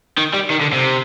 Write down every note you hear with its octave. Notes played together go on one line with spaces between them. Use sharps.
D#3
G3
D#3
D3
C3